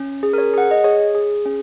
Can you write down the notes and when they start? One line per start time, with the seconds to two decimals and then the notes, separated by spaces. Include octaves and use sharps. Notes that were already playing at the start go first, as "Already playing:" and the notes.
Already playing: C#4
0.23 G#4
0.33 A#4
0.38 C#5
0.53 G#4 F#5
0.71 D#5
0.84 G#4 C#5
1.15 G#4
1.45 C#4